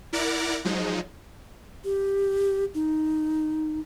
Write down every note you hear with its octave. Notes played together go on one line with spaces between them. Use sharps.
E4 A#4 D5 F#5 A#5 D6
F3 F#3 G#3 D#4
G4
D#4